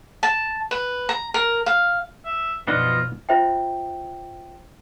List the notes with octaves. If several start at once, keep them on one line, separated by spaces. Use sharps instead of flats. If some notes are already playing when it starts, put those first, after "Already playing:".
A5
B4
A#5
A#4
F5
E5
F#2 B2 F3 B3 D4 D#4 F4 D#5
F4 C5 E5 G5